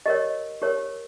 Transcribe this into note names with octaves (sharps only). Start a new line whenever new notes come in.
G4 A#4 C#5 D#5
G4 A#4 C#5